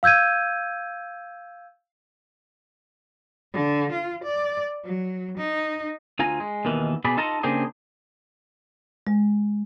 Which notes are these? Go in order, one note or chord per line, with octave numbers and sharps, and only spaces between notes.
F5 E6 G6 G#6 D#7
D3
F4
D5
F#3
D#4
D2 F4 G#5 A#5
G#3
D#2 B2 D#3 E3
B2 G#4 D5 B5
D#4 F4 A4 A5 A#5
C#3 A#3 C4 D4 G4 G#4
G#3